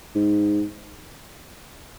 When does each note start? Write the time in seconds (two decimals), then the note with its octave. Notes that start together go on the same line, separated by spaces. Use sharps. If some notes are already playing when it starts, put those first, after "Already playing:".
0.15 G#2